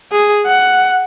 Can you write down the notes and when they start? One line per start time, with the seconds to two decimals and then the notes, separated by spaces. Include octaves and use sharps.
0.12 G#4
0.46 F#5